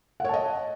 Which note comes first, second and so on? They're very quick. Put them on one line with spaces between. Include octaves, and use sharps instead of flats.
F#5 C#5 A5 D#5